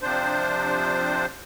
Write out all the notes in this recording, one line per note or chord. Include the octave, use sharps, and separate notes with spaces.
C3 F3 D4 C5